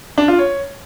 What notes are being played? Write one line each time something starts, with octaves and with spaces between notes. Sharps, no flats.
D4
F4
C#5